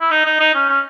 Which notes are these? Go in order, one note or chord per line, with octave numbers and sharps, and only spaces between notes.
E4
D#4
D#4
D#4
C#4
C#4